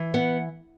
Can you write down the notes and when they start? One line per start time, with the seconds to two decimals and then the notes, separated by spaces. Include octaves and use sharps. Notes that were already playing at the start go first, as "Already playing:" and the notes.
Already playing: E3
0.14 B3 F#5